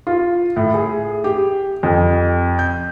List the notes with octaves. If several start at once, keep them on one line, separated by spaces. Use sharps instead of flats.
F4
A2
G#4
G4
F2
G6